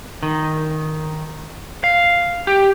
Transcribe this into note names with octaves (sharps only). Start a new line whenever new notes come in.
D#3
F5
G4